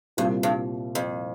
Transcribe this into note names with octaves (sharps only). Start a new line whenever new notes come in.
C2 G2 A#2 G3 C4 F4
G2
F2